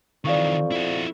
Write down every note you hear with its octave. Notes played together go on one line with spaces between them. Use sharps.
F2 D#3 E3 D5 F5 C#6
E4 F#4